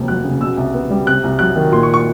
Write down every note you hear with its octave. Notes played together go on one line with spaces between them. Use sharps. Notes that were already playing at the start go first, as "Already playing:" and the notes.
Already playing: F1 D#2
F#3 F#6
C#3
B2 E6
C2
B3
G3
C3 F#6
C2
F#3 F#6
D#3
A#2 C6
C#6
C#6